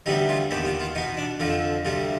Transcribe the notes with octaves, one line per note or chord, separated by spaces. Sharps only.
D2 C3 G3 B3 D#4
F4
D#2 D#3 B3 G4
F4
F4
B2 B3 D#4
D4
F2 D3 F3 F4
D2 C3 G3 F4